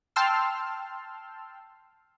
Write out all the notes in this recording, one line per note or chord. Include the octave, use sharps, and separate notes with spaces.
G5 A5 C6 E6 F6